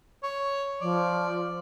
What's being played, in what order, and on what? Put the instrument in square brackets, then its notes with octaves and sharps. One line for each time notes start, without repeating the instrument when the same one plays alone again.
[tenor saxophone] C#5
[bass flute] F3 [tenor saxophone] D5